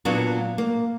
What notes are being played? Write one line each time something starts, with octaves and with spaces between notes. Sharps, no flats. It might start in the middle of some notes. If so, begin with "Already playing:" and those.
A#2 F#3 B3 D4 F4 F#4
A#3